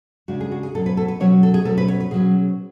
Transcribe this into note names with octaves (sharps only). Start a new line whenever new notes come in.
C#3 G#3 D4 F#4
G#4
F#4
G#4
B2 F#3 C#4 A4
B4
A4
B4
B2 F#3 C#4 C#5
A4
G#4
B2 F#3 C#4 A4
B4
C#5
B4
B2 F#3 C#4 G#4